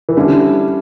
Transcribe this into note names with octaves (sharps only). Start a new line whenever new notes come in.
E3
D3 G3 C#4 E4